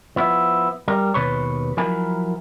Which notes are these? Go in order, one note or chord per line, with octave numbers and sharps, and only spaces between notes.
F3 B3 E4
G3 A#4
D#2 B2 B4 C#5
F3 F#3 E4 A#4 G#5 B5